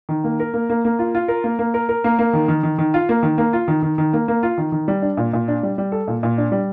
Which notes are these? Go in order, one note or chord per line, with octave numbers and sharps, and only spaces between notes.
D#3
A#3
A#4
A#3
A#3
A#3
F4
F4
A#4
A#3
A#3
A#4
A#4
A#3
A#3
D#3
D#3
D#3
D#3
F4
A#3
D#3
A#3
F4
D#3
D#3
D#3
A#3
A#3
F4
D#3
D#3
G3
D4
A#2
A#2
D4
G3
G3
A4
A#2
A#2
D4
G3